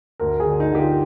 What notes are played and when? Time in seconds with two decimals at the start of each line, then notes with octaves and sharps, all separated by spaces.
0.20 D2 A#4
0.40 G#4
0.46 D3
0.60 D#4
0.73 D3 G4
0.79 F4